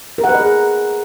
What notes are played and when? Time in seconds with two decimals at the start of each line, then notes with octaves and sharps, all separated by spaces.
0.18 A#4
0.24 F#5
0.29 B4
0.34 D#5
0.40 G#4